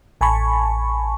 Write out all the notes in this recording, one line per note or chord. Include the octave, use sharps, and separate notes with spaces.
A1 G#5 A5 B5 C#6